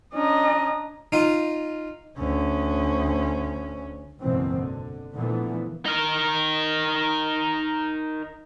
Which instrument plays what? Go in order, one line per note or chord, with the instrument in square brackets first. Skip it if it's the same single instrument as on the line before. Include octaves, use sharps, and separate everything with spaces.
[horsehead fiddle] C#4 D#5 [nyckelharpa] D4 A#5
[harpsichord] D#4 F4
[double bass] D2 C#4
[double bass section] F#1 B1 G#2 B2 E3 C4
D3
A#2 D3 E3 F3 A3 B3
[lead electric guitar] D#4 A#4